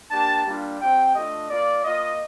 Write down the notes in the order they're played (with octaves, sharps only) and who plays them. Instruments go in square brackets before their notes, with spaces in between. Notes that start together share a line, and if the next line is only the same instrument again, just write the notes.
[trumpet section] A#3 D4 G4 A5
G3 A#3 D4 F4
C4 G4 G5
A3 D4 F4 D#5
A#3 F4 D5
A#3 F4 D#5